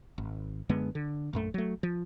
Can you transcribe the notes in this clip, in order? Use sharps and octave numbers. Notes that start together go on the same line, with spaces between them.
G#1
F#2 D3 G#3 B3
D3
A#1 F#2 A3
F#3 A3
F3